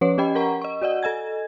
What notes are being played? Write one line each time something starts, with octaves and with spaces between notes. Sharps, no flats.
F3 C#4 B4 C#5
C#4 G4 D#5 G5 B5
A#4 F#5 A#5 C#6
D#5 C#6
F#4 D5 D#5 F#5
A4 D#5 G#5 G#6